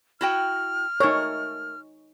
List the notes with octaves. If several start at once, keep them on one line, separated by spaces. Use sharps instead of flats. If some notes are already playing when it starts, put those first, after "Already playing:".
E4 F#4 G5 F6
A3 D#4 A#4 C#5